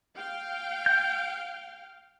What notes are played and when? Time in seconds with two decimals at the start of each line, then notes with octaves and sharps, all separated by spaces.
0.15 F5 G5
0.86 G6